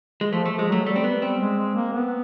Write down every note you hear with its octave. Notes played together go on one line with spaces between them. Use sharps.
G#3
F3 A3
F3 A3
G#3
F#3 A3
G3 A3
C4
B3
C4
G#3
G#3
A#3
B3